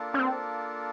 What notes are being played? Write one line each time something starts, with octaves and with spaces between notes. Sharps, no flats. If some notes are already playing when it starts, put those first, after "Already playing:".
Already playing: A#3 D4 F4 A4
C#4
C4